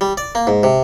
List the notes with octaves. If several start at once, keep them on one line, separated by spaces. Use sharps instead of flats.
G3
D5
A#3
G#2
C3